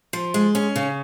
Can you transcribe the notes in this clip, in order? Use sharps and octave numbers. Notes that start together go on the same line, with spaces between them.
F3
G#3
C#4
C#3